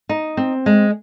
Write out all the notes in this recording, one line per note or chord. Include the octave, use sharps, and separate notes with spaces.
D#4
C4
G#3